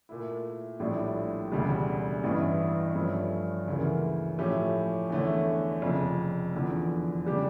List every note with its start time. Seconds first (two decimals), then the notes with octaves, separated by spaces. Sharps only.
0.09 A#2 A3 E4
0.80 A#1 A2 G3 D4
1.52 E1 D2 C#3 G3
2.23 A1 G2 E3
2.95 G2 F3 A3 C#4
3.67 D2 C#3 E3 A#3
4.38 A2 F3 A3 C#4 G4
5.10 E2 D3 A3 C#4
5.82 F1 F2 C#3
6.53 E2 D3 F3
7.25 C#3 G3 D4 G4